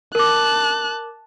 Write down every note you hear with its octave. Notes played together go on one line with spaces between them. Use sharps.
A#4 A5 D6 F#6